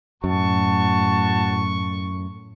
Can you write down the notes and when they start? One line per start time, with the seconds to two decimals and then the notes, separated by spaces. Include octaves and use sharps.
0.24 F#2 A2 F#4 A5 C#6